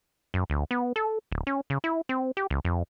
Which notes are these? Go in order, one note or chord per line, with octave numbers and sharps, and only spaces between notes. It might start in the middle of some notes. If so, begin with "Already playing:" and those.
F#2
D2
B3
A4
D1
C#4
C#3
E4
C4
G4
C#2
F2